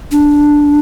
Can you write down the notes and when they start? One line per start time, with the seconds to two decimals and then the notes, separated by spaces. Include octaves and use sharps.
0.12 D4